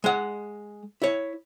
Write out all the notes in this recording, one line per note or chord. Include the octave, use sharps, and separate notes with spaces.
G#3 F#5
E4 C#5